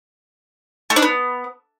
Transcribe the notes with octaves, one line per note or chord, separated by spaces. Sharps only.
A3
D4
B3